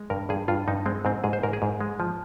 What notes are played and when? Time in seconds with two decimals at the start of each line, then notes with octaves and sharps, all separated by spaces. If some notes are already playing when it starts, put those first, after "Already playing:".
Already playing: G#3
0.10 G2 A#4
0.29 G2 G#4
0.48 G2 F4
0.68 G2 D#4
0.86 G#3 C4
1.05 G#2 C4
1.24 G#2 G#4
1.33 C5
1.43 G#2 A#4
1.53 G#4
1.62 G#2
1.81 G#3
2.00 F3